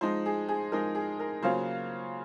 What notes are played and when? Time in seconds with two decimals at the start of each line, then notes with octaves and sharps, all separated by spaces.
0.01 F3 G#3 D#4 C5
0.26 G#4
0.49 G#4
0.72 F3 G#3 D#4 A#4
0.95 G#4
1.19 A#4
1.43 C#3 F#3 A#3 C#4 F4 C5